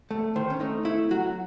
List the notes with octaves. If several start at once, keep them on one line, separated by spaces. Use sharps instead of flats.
A3
D#3 C5
C#4
A3 D#4
A3 E4
F#3 F#4